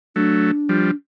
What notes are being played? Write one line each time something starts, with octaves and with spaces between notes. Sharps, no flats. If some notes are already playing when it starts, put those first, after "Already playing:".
F#3 A3 D4
F3 G3